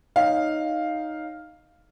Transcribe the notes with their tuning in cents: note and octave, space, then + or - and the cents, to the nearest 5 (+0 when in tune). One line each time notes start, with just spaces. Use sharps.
D#4 +0 C#5 +10 F5 +0